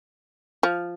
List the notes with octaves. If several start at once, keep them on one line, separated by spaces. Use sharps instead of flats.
F3